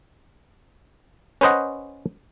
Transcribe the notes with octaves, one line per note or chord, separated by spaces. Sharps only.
C#4 B4 C5 D#5 F#5